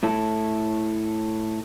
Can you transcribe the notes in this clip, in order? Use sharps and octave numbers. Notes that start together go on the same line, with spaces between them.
A2 E4 A4